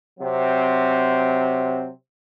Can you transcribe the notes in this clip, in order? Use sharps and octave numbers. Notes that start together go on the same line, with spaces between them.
C3 F#3 C4